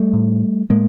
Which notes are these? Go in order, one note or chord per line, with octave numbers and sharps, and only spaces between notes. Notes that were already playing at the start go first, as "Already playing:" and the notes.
Already playing: G3 A3
A2
A2 G#3 A#3